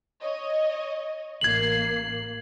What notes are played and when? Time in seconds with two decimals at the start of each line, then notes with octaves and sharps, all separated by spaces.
0.22 C#5 D#5
1.41 A1 A#3 G#6 C7 F#7